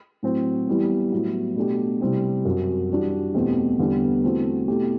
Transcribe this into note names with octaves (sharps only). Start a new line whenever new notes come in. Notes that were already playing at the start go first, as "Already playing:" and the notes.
A2 F#3 C4 F#4
E3 G3 B3 E4
A2 F#3 B3 E4
B2 A3 D4 G4
C3 G3 C4 E4
F#2 F#3 C4
E3 G3 D4 F#4
E2 B2 A3 C4 G4
E2 D3 G3 B3
E3 A3 C4 F#4
B2 A3 E4 G4